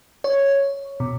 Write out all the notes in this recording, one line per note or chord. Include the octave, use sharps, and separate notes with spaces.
C#5
B2